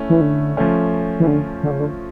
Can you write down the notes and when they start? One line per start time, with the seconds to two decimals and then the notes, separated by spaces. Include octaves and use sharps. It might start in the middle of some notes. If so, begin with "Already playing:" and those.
Already playing: A3 C#4 E4
0.10 E3
0.21 D3
0.57 F3 A3 C#4
1.20 E3
1.27 D3
1.63 D3
1.71 C#3
1.80 D3